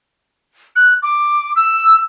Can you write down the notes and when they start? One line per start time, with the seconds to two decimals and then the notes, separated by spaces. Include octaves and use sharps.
0.76 F#6
1.03 D6
1.56 E6